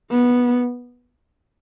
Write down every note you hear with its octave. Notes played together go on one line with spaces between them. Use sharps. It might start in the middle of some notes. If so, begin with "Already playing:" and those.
B3